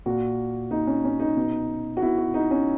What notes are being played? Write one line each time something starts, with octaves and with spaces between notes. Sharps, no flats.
A#2 F#4
A#2 D#4
C#4
C#4
D#4
B2
F#4
B2 E4
F#4
D#4
C#4